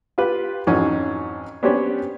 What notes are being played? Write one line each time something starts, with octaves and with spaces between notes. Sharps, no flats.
F4 G4 B4
F2 G#2 E3 F#3 C#4
B3 C#4 D4 G4 C5 C#5